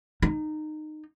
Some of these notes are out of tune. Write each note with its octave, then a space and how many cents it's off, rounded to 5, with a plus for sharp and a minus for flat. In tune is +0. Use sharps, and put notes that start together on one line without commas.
D#4 -20